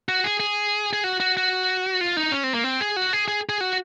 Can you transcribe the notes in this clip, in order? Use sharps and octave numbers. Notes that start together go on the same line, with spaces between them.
F#4
G#4
G#4
G#4
F#4
F#4
F#4
F4
D#4
C#4
C4
A#3
C4
G#4
F#4
G#4
G#4
G#4
F#4